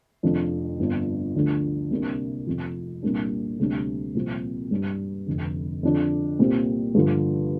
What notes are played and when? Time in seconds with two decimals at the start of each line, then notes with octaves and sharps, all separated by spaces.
0.23 F1 F2 F3 D4
0.79 G1 F2 F3 D4
1.35 D2 D3 F3 D4
1.91 C2 C3 A#3 D4
2.47 F1 F2 F3
3.03 C2 A#2 G3 A#3 D4
3.59 D2 C3 G3 D4
4.15 C2 A#2 F3 C4
4.71 G2 G3 D4
5.27 F1 F2 D3
5.83 F2 D3 F3 D4
6.39 C2 A#2 G3 C4
6.94 G2 D3 F3